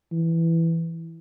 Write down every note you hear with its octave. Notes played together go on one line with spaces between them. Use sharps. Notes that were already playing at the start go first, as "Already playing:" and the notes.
E3